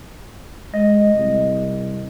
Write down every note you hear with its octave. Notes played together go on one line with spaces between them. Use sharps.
G#3 D#5
C2